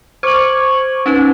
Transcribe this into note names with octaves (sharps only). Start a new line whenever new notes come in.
C5 C#6 D6 G#6 F#7
C#4 D#4 B4